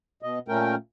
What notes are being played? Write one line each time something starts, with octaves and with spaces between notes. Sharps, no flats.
B2 D#5
A#2 A3 C#4 A#4 G5